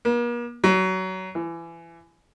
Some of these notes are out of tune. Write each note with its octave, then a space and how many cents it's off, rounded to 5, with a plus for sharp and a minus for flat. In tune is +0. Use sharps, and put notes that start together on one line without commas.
A#3 +45
F#3 +20
E3 +25